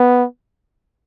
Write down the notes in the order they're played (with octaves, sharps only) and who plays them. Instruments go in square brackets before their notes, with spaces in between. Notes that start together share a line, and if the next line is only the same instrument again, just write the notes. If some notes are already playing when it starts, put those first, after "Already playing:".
Already playing: [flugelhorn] B3